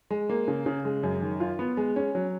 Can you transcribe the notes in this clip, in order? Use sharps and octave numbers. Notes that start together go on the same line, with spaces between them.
G#3
A#3
C#3
C#3
G#3
F#2
D#3
F4
B3
G#3
C#4
F#3